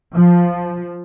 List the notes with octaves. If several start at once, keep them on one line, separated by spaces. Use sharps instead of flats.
F3